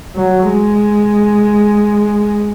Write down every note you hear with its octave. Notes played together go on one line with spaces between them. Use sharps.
F#3
G#3